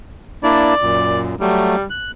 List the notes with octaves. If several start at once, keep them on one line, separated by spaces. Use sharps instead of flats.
A#3 D4 E4 D5
F#2 A#2
F#3 G3 A3
F#6